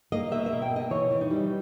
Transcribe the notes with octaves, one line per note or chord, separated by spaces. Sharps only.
A#3 D#5
B2 E5
E5
A#3
G5
B2 D#5
E3 C#5
E3
D#4
G3